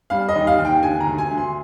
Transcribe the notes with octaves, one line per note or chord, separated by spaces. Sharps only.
G3 F5
D#5
D#2
F5
D#2
G5
D3 G#5
A#5
D2
G#5
D2
C6